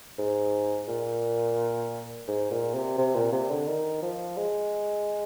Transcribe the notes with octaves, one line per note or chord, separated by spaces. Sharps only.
G#2
A#2
G#2
A#2
C3
C3
A#2
C3
D3
D#3
F3
G#3